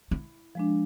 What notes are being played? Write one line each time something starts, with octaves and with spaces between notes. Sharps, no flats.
E4
F3 G#3 D4